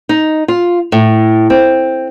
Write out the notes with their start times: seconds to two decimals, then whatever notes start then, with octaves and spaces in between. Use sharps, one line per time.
0.09 D#4
0.48 F4
0.92 A2
1.50 C4